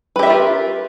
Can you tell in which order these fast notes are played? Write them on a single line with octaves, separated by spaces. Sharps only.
B4 G4 E5 A#4 F4